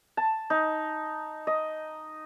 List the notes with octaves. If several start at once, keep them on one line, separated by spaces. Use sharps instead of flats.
A5
D#4
D#5